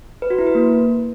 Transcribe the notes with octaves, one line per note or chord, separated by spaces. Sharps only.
B4
F#4
E4
B4
A#3